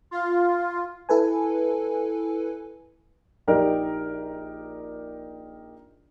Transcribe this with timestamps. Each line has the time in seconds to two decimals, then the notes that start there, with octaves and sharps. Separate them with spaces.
0.11 F4
1.09 E4 A4 B4 G#5
3.47 A#1 D#4 G4 A#4 D5